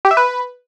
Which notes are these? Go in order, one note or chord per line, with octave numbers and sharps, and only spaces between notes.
G4
E5
B4